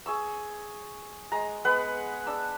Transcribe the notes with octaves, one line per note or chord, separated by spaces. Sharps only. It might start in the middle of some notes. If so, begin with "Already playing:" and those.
G#4 C#6 E6
G#3 A#5
G#3 B3 B4 F#5
D4 E6